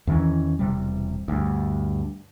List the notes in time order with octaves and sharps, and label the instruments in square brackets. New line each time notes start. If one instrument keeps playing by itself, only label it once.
[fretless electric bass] E2 D#3 E3 C#4
E1 C3 G3
D2 G2